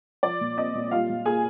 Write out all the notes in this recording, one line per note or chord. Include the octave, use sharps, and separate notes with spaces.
F3 D5
A#2
C4 D#5
A#2
G3 F4 F5
A#2
A#3 G#4 G#5